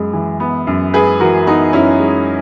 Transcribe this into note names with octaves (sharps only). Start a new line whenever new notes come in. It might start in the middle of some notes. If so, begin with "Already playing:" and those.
Already playing: F#2 G#3 B3
E3
B3
F#2
G#3 G#4 B4
E3 F#4 A#4
B3 D#4 F#4
F#2 C#4 E4
G#3